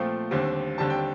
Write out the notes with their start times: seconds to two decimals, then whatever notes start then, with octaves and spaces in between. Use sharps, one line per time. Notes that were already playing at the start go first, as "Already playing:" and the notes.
Already playing: A#2 F3 A3 C4 G5
0.31 D#2 D3 G3 C4
0.78 D#2 D3 G3 C4 A5
0.90 G5